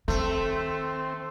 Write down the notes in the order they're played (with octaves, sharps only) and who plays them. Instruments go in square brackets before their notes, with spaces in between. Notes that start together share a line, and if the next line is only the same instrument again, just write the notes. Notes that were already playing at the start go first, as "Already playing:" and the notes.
[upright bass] D#3 [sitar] A3 [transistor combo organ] C4